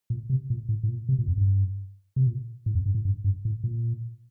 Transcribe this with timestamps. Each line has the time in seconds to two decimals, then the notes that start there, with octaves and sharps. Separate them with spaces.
0.10 A#2
0.30 C3
0.50 A#2
0.69 A2
0.83 A2
0.89 A#2
1.09 C3
1.19 A#2
1.28 F2
1.37 G2
2.16 C3
2.27 A#2
2.66 A2
2.75 F2
2.86 G2
2.95 A2
3.05 G2
3.24 G2
3.45 A2
3.64 A#2